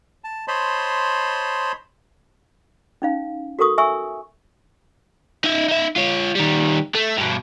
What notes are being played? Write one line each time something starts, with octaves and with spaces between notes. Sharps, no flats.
A5
C5 C#5 D#5 A5 B5 C6
C#4 D#4 F5
F#4 A4 A#4 C#6 D#6
E5 G#5 C#6 E6
D#4 E5
D#4 E5
F4 C#5
D#3 G3
A3
G2 B2